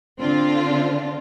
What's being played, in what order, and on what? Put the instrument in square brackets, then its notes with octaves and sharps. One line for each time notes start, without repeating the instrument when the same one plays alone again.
[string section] D3 C4 D4 F4